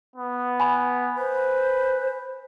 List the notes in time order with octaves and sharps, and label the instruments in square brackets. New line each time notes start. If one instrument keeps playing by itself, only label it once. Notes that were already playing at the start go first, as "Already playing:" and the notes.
[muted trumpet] B3
[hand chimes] G#5 B5
[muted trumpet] B4 [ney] C5